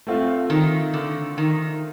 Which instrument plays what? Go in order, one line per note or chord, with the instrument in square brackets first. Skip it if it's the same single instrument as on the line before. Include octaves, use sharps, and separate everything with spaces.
[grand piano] A3 C4 F4
[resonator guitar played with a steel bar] D#3
D3
D#3